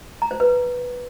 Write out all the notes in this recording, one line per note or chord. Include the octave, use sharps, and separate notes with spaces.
A#5
C5
B4